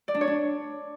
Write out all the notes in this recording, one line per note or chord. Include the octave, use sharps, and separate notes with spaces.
D5
D4
C#5
D4